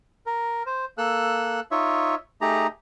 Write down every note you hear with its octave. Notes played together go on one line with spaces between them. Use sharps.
A#4
C5
A#3 A4 E6 F#6
D#4 F4 C#5 E5
A3 D#4 G4 G#4 A#5